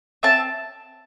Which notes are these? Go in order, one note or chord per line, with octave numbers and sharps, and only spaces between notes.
C4 E5 A5